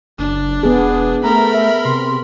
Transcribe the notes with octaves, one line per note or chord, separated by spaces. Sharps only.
F#1 D4
E1 B3 G#4
A3 A#4 A#5 B5
E5
C3 C6